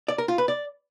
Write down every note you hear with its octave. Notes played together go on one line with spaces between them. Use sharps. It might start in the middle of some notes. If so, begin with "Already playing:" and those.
D5
A#4
F4
B4
D5